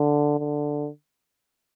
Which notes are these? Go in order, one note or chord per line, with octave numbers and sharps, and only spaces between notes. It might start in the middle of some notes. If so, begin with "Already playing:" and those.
Already playing: D3
D3